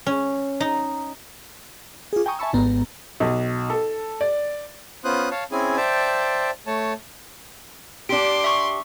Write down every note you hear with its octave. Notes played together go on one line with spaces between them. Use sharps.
C#4
D#4
F4 G#4
G5 G#5 A#5 C#6 D#6
E5 G#5 A5 B5 C#6 E6
G#1 G#2 B3 A#5
B1
A4
D5
B3 C#4 F4 C5 D#6 F#6
C#5 F5 A5
C4 C#4 E4 G#4 G#5
C5 D5 E5 G5 A5
A3 C#5 A5
D4 G4 C6 D6 D7
E5 C#6